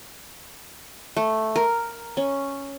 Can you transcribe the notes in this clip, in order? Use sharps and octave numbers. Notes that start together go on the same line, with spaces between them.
A3
A#4
C#4